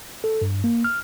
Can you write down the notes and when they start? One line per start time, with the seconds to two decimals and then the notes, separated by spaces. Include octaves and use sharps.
0.24 A4
0.42 G2
0.64 A#3
0.84 F6